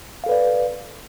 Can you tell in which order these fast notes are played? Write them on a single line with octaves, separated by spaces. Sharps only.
F5 A4 B4 D5